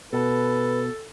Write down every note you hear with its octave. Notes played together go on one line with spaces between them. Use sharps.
B2 A4 B4